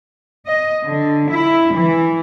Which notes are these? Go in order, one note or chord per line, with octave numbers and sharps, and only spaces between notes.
D#5
D3
E4
E3